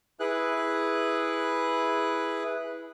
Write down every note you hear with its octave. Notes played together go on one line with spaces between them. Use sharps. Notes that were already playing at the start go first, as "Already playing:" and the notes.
E4 G#4 B4 F#6